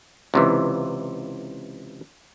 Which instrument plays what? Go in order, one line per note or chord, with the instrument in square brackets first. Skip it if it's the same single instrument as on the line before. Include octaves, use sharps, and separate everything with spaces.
[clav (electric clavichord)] C#2 C3 E3